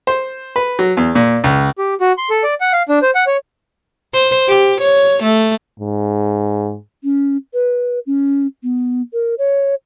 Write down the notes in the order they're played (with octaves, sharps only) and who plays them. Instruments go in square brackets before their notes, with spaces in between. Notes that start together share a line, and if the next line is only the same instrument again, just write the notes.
[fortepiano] C5
B4
F#3
E2
A#2
C#2
[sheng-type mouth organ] G4
F#4
C6
A4
D5
F#5
F5
D4
C5
F#5
C#5
[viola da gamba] C5
G4
C#5
A3
[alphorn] G#2
[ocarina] C#4
B4
C#4
B3
A#4
C#5